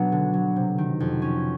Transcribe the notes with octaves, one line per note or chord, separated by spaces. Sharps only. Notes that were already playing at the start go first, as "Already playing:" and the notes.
Already playing: B2 F#3 B3 D4
D3
F#3
C3
D#3
F2
C#4